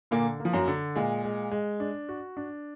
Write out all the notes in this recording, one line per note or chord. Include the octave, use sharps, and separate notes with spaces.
A#2 D3 A#3
A#3
F3
F#2 F#3
D3
A#2 G#3
G#3
G#3
D4
F#4
D4